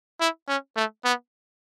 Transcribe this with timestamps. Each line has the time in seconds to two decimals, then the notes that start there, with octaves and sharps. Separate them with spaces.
0.20 E4
0.48 C#4
0.76 A3
1.04 B3